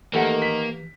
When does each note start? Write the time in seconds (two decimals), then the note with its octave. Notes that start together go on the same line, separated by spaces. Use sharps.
0.14 D#3 E3 A3 A#3 G4 F#5
0.42 B6